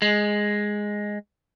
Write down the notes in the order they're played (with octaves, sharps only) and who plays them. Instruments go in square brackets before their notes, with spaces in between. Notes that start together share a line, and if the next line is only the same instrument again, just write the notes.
[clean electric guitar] G#3